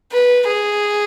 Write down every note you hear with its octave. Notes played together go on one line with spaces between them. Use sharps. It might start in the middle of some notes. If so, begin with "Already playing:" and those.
B4
G#4